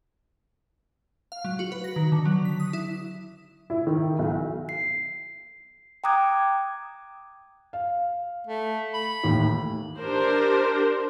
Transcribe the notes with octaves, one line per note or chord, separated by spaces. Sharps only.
F5
F#3
F#4
B4
A#6
D#3
D3
F#3
B6
D#6
E4
E4
D#3
B1
C7
G5 A#5 D6 D#6 F#6 G#6
F5
A3
B5
D#2 A2 E3
D4 G4 A#4 C5